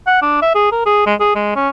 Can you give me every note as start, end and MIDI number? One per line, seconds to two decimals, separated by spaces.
0.07 0.21 78
0.22 0.40 62
0.42 0.52 76
0.55 0.72 68
0.72 0.81 70
0.86 1.06 68
1.06 1.15 56
1.20 1.31 68
1.35 1.51 56
1.55 1.69 61